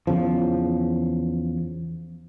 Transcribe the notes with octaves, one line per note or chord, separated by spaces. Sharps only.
E2 C#3 F3